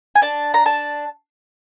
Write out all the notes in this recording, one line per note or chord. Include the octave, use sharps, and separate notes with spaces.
G#5
D4 A5
A#5
D4 A5